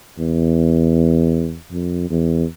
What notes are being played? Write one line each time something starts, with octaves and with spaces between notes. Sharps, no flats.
E2
F2
E2